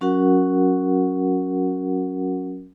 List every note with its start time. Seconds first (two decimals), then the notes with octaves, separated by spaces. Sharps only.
0.01 F#3 C#4 F#4 A#4 F#5